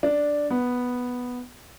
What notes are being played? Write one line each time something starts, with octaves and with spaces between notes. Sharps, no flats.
D4
B3